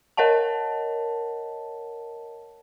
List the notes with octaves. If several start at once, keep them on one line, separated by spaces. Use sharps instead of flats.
A#4 C#5 D#5 F#5 A5